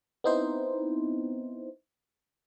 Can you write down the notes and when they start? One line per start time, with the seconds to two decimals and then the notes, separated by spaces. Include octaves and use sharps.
0.24 B3 C4 D#4 E4 C5